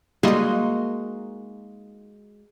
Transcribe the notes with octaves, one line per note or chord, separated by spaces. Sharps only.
G3 G#3 A#3 D#4 F#4 D#5 C6